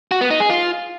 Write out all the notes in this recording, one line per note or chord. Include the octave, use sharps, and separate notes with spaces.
F#4
B3
D#4
G#4
F4